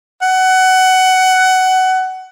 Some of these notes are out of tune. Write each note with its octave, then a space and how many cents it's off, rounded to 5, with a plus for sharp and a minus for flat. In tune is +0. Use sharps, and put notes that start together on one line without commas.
F#5 +20